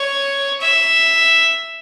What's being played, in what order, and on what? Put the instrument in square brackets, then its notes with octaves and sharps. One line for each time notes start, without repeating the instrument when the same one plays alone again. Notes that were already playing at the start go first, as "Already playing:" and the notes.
Already playing: [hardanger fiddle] C#5
E5